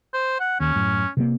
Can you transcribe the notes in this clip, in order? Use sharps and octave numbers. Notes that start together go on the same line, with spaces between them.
C5
F#5
D#2 C#4
F#2 A2
C3 G#3 A#3